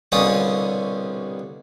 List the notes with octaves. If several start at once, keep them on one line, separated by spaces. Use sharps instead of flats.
C2 B2 D3 C#4 F4 D#6